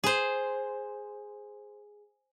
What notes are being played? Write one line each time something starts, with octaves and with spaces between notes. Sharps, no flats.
G#4 C5